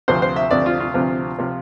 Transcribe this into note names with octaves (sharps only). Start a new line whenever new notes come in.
D2 C3 F3 C4 C5
C5
E5
D2 C3 F3 C4 D5
F4
F4
D2 C3 F3 C4
C3 F3 C4